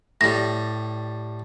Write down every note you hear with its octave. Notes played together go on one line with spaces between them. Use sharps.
A2 G3 A#6